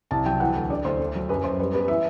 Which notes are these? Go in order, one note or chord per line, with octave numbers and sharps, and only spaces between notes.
C2 A5
F#3 G5
E3 F#5
D2
D3 D5
D2 C5
A3
F#3
F#2 B4
F#2 C5
G3 B4
B3 B4
E3 E5